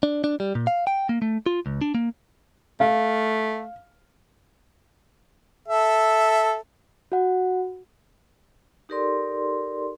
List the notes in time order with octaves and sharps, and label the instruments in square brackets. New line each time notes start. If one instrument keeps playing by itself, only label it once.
[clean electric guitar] D4
D4
G3
A#2
F5
G5
A#3
A3
F4
C#2
D4
A#3
[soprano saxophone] A3 [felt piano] F5
[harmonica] A4 E5
[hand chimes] F#4 F#5
[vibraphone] D#4 G4 A4 A#4 D5 C6